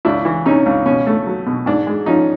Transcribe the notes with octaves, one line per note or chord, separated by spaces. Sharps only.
C#2 D4 E4
E3
C3 C#4 D#4
C#2
B2 C#4
A3
F#3
B2
G#2 D4
G#3
F3 C#4 D#4